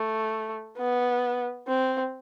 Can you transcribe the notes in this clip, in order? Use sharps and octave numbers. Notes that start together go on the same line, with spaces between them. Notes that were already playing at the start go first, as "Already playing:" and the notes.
Already playing: A3
B3
C4